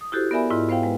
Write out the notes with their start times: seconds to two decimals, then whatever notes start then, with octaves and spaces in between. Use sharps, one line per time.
0.01 D#6
0.12 E4 F#4 G4 A4 C5
0.31 B3 A#4 D5 E5 G#5 B5
0.50 G#2 E4 F4 D#5
0.69 B3 C5 F5 G5
0.83 G#3 B4